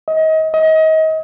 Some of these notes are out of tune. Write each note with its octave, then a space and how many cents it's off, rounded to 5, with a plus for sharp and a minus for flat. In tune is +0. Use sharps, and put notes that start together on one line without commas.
D#5 +30
D#5 +30